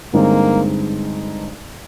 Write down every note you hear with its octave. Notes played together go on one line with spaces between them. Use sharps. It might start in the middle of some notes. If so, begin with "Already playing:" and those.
G2 D3 G#3 A#3 C4 D#4